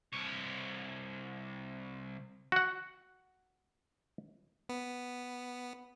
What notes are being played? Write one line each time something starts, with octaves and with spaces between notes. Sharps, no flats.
C2 C#5
F#4 F#5
B3